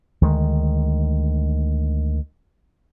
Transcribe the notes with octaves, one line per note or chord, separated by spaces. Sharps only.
D2 D#3 G#3